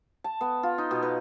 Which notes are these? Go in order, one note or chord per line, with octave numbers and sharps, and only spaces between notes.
A5
B3
F4
D#4
B2
B4